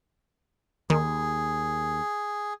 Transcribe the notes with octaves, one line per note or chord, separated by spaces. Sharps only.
D#2 D#3 G#4